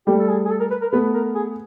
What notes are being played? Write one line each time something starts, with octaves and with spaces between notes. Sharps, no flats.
G3 A3 G4
A4
G#4
G#4
A4
A#4
B4
A#4
A3 B3 B4
A#4
G#4